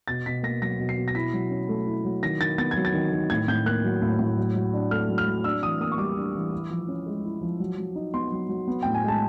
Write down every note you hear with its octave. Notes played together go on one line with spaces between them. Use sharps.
B2 A6
B2 B6
A#3 A#6
F#3 A#6
B2
C7
B2
A#6
E4 B6
F#3
C#4
A3
E4
F#3
D#3 A#6
D#3 A6
B3 A6
G#6
F#3
A6
D#3
D#3
A2 G#6
A2 G6
A#3 F#6
F#3
A2
A2
F#3
F#3
D4
A3 F6
F#3
F6
F#3
D4 E6
E3 D#6
A#3 D#6
C#6
G3 D6
D4
E3
E4
F3
C#4
G#3
E4
F3
F#3
F#3
D#4
B3 C6
F#3
F#3
B3
A2 G5
G#5
G#3 A5